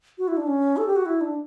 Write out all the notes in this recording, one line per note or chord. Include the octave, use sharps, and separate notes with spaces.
F#4
E4
D4
C#4
A4
G4
F#4
E4
D4